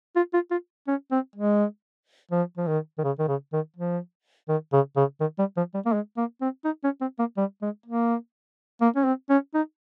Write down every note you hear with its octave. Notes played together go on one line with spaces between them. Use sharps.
F4
F4
F4
C#4
C4
G#3
F3
F3
D#3
D#3
C#3
D#3
C#3
D#3
F3
D#3
C#3
C#3
D#3
G3
F3
G3
A#3
G#3
A#3
C4
D#4
C#4
C4
A#3
G3
G#3
A#3
A#3
C#4
C4
C#4
D#4